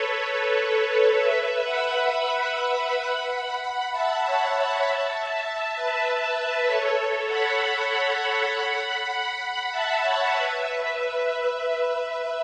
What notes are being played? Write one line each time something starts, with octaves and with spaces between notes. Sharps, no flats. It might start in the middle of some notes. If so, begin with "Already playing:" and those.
Already playing: A4 B4 C#5
B4 E5
F#5 B5
E5 A5
C#5 F#5
E5 A5
E5 A5
B4 E5
B4
A4 C#5
A4
F#5 B5
F#5 B5
E5 A5
C#5 F#5
B4 E5